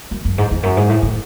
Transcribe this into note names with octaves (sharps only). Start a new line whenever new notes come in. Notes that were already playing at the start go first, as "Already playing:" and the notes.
F#2
F#2
G#2
E2
F#2
G#2
A2
A2